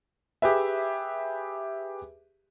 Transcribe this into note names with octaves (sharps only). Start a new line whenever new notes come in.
G4 G#4 B4 E5